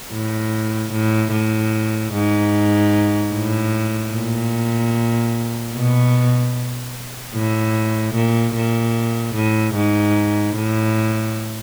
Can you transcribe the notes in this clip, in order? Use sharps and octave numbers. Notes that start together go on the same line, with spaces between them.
A2
A2
A2
G#2
A2
A#2
B2
A2
A#2
A#2
A2
G#2
A2